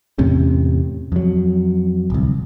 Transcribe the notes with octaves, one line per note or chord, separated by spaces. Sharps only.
E2 A2 C3 C#4
F2 F#3
D1 C2